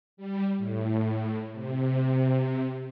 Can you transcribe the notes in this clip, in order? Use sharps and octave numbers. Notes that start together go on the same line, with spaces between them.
G3
A2
C3